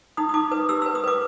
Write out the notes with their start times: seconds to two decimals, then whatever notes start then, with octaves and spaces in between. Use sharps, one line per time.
0.17 D#4 D#6
0.29 D#6
0.34 D#4 D6
0.51 B4 D#6
0.69 G4 E6
0.82 B4 E6
0.95 D#6
1.04 B4 D6